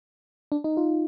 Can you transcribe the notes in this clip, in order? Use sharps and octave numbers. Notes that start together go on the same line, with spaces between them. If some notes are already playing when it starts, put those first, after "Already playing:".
D4
D#4
F4